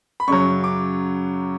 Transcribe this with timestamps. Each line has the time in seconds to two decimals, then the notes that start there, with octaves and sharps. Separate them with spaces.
0.20 B5
0.28 F#2 C#3 F#3 C#6
0.64 D6